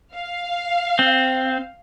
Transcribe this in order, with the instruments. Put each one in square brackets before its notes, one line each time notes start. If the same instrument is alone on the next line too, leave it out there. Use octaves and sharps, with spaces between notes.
[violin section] F5
[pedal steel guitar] C4